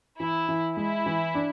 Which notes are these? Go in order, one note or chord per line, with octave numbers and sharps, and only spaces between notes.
E3 E4
E3
G#3 E4
E3
D4